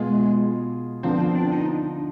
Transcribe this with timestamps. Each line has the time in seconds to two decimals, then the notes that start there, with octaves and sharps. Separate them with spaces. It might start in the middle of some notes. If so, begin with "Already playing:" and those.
Already playing: B2 G#3 B3 F4 G#4
1.03 D3 F3 B3 C4
1.20 C4
1.35 D4
1.52 D#4